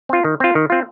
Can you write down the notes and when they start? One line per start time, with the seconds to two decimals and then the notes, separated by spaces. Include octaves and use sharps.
0.09 C4 F4
0.24 D#3
0.40 C4 F4
0.55 D#3
0.70 C4 F4